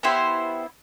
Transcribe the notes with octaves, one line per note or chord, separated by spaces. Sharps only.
B3 E4 G4 C5